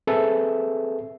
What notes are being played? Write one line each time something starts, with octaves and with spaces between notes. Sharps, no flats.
C4 G#4 A4 B4 E5